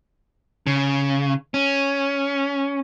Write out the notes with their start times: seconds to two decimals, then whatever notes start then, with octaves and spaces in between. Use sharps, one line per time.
0.67 C#3
1.54 C#4